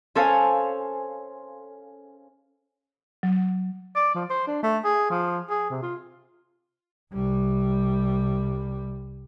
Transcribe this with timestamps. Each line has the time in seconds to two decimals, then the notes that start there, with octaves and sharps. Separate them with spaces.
0.15 C#4 A4 C5 C#5 F5 G#5
3.23 F#3
3.95 D5
4.15 F3
4.30 C5
4.47 D4
4.63 A3
4.84 G#4
5.10 F3
5.50 G#4
5.70 C3
5.82 F4
7.13 C2 G3